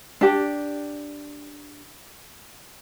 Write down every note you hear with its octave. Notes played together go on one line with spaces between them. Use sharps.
D4 G4 D5